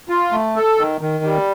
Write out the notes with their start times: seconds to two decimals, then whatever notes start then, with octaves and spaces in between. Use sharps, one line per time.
0.09 F4
0.32 A3
0.56 A4
0.78 D#3
1.01 D#3
1.24 G3